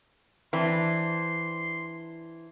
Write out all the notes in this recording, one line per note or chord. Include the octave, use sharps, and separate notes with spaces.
E3 C4 D4 C6